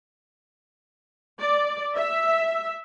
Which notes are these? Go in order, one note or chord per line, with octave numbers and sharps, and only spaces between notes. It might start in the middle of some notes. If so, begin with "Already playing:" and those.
D5
E5